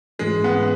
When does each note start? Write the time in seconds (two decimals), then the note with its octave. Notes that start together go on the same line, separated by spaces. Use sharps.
0.19 G#2 E3 G#3 A3 C#4
0.44 B3